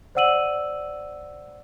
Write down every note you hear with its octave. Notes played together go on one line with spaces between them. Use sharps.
C5 D5 F#5 E6 D#7 F#7